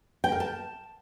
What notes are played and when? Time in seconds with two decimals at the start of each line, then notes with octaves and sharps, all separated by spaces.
0.24 G5
0.32 A#4
0.40 A5